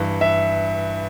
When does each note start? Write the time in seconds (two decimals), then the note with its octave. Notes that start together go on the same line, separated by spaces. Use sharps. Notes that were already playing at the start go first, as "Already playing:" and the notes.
Already playing: G2 E3
0.21 E5